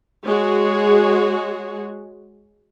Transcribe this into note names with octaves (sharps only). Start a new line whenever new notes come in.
G#3 F#4 G#4 C#5